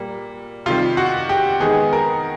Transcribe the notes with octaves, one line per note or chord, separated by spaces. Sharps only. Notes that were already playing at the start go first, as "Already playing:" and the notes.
Already playing: A#2 G3 A#3
C3 D#3 G3 F4
F#4
G4
D#3 G#3 B3 G#4
A#4